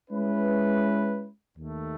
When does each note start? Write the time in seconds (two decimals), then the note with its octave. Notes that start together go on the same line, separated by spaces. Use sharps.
0.11 G#3 C#4 E4 B4
1.58 D#2 D#3 A3